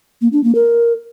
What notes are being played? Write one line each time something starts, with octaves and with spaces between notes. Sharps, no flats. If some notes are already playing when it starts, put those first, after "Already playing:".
A#3
D4
A#3
A#4